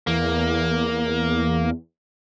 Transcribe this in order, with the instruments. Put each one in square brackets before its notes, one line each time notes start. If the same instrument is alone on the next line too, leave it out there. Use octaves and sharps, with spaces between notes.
[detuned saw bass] E2 [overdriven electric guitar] A#3